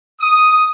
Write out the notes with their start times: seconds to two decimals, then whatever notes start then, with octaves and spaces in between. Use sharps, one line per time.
0.20 D#6